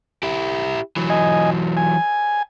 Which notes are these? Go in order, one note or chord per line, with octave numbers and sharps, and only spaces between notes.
E4 G4
E3 F#3
D#5 G#5
G#5